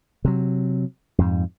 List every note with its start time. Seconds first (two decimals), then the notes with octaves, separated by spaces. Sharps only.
0.25 C3 F#3
1.18 F2 G#2